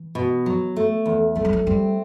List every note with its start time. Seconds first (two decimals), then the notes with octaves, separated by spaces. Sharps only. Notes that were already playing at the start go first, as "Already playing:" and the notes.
Already playing: E3
0.15 B2
0.46 F#3
0.76 A3
1.06 E2
1.36 F#3 A3
1.45 G3
1.53 F#3
1.66 G3 C4